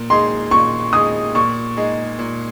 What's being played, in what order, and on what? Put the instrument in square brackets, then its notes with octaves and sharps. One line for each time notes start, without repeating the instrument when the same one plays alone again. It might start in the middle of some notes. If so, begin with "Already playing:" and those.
Already playing: [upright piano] A#2
[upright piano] G#3 D#4 G#4 [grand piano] C6
[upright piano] A#2 [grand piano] C#6
[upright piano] G#3 D#4 G#4 [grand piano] D#6
[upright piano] A#2 [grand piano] C#6
[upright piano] G#3 D#4 G#4
A#2